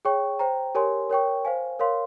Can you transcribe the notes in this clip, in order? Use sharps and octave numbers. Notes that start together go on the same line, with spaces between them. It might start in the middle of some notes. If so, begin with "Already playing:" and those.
G#4 C#5 G5 C#6
C5 G5 A#5
G4 A#4 C#5 G#5 C6
A#4 C#5 G5 C#6
C5 F5 G#5
A#4 C#5 F5 C6